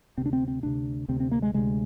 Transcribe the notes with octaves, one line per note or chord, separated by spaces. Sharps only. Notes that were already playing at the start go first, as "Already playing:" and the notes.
D2 C3 C4
D4
C4
C4
D2 C3 D4
D2 C3 C4
C4
A#3
G#3
D2 C3 G#3